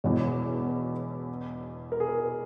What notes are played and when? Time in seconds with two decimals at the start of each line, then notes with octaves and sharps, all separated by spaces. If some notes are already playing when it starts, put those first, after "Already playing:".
0.04 E1 E2 B2 C#5
0.24 B4
0.46 C#5
0.67 B4
1.92 A#4
2.00 G#4
2.09 A#4